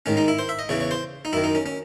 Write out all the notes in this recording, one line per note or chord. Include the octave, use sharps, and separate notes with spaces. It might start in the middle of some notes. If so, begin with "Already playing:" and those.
G#2 D#3 C#4
D#4
E4
C5
E5
D#5
E2 C#3 E3 C#5
C#5
C5
D#4
F#2 D#3 E4
D#4
C#4
C#4